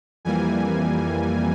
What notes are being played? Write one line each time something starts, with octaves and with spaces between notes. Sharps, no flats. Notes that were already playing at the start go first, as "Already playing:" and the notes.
F2 E3 G3 A#3 G#5